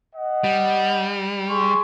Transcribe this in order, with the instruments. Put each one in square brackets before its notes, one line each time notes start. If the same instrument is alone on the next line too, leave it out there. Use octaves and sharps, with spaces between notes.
[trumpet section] D#5 F#5
[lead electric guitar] G3
[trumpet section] G#4 C6 C#6